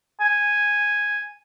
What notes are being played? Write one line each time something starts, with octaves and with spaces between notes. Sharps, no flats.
G#5